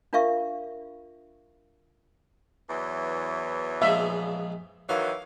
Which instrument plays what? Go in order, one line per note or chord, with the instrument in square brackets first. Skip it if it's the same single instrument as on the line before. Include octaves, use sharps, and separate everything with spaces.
[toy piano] D4 F4 A#4 E5 F5 C#6
[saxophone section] E2 E3 F#3
[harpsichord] A#1 F3 G#3 [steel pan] E5
[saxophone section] D#3 E3 F#3 [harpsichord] F5